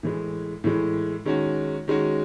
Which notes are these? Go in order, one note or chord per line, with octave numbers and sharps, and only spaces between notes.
A2 E3 G#3
A2 E3 G#3
D#3 G#3 C#4 F#4
D#3 G#3 C#4 F#4